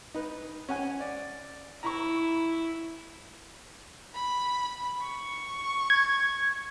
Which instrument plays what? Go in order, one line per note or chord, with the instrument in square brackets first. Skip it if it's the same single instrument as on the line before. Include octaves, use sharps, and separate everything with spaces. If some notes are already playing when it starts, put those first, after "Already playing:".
[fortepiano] D#4 B4
C#4 F#5 G#5
D5
[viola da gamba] E4 [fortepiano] A#5 B5 C#6
[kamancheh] B5
C#6
[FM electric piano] G#6